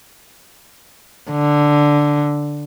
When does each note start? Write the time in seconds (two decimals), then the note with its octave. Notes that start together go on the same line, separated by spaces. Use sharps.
1.32 D3